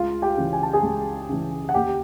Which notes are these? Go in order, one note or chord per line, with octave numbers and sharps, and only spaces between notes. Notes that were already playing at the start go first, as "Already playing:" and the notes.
Already playing: C#2 F4 F5
G4 G5
C#3 E3
G#5
A5
G#4 G#5
C#2
C#3 E3
F#5
D#2 G4 G5